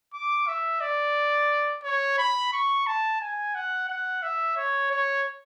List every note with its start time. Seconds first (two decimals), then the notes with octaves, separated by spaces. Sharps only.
0.13 D6
0.47 E5
0.81 D5
1.83 C#5
2.18 B5
2.53 C#6
2.87 A5
3.21 G#5
3.55 F#5
3.88 F#5
4.22 E5
4.57 C#5
4.91 C#5